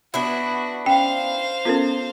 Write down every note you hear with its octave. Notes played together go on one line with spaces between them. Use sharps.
B3 D4 E4 F#4
C#4 C5 F5 G5
B3 C#4 F4 A4 A#4